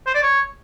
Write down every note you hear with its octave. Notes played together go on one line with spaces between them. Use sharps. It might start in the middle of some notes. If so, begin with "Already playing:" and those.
C5
D5
C#5